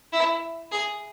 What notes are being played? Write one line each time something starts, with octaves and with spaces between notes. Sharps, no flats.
E4
G#4